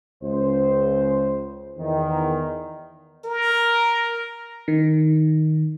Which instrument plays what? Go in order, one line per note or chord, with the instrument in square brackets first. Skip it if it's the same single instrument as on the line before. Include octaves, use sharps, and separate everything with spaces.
[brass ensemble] C#2 C5
E2 D#3
[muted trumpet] A#4
[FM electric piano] D#3